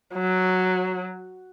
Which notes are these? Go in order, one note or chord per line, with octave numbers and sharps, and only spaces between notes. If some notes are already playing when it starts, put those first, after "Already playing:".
F#3